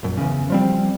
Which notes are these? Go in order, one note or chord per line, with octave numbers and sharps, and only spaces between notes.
A#1 F#2
E2 C#3
F3 G3 C4